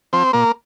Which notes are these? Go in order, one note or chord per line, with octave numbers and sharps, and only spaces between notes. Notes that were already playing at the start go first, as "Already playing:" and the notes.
F3 C4 C5
A#2 A#3 A#4